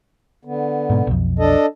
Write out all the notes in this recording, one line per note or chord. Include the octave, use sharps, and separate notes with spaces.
D3 B3
G#2 B2
B1 F2
D4 A4 D#5